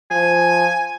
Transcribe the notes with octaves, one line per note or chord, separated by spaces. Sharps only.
F3 G#5